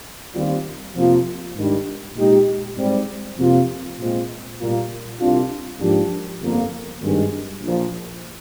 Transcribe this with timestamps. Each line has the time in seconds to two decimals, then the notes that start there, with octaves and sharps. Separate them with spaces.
0.34 D#2 D#3 G3 C4 F4
0.95 F2 C3 F3 A#3 F4
1.55 G#2 D#3 G3 D4
2.16 A#2 G#3 D#4 G4
2.77 G#2 G3 C4
3.38 F2 C3 F3 A#3 F4
3.98 A#2 G#3 C4 F4
4.59 A#2 G3 A#3 F4
5.20 C2 C3 G3 D4 F4
5.80 G#2 F3 A#3 D4 G4
6.41 G1 F2 D3 F3 A#3
7.02 G#1 G2 D#3 G#3
7.62 A#1 A#2 F3